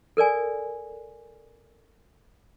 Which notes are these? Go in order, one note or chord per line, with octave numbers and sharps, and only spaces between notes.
A4 A#4 D5 G#5